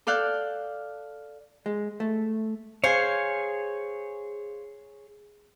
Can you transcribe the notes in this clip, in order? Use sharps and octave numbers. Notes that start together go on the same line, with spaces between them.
A4 D5 F5 F#6 G6
G#3
A3
G#4 C5 C#5 F5 G#5